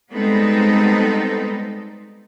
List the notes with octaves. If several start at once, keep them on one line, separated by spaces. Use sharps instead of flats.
G3 G#3 B3 C4 D#4 A4